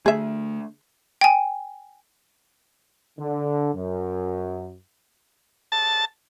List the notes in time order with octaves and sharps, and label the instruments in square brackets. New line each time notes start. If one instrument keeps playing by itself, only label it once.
[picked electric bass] D3 A3 [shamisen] G#4 E5
[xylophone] G5 G#5
[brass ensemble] D3
F#2
[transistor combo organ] A5